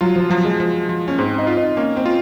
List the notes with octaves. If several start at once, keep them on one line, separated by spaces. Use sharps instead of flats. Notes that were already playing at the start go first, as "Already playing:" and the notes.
F#3 F4
F3
F3 F#3
G#3
F3
F3
C#4
G#2 C4
D#4
F4
D#4
A#3 C#4
C4
F4